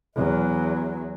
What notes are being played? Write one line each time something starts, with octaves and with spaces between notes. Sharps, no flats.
E2 F#3